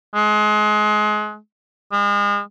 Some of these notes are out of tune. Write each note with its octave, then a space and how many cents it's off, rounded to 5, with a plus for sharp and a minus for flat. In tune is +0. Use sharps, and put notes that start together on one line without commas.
G#3 +30
G#3 -35